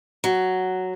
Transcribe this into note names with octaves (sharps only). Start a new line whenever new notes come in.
F#3